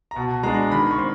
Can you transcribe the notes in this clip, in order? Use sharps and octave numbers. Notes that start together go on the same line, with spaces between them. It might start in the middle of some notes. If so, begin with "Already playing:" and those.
A#5
B2 A5
G#3 B3 D4 A#5
D#3 B5
C#6
C4 C6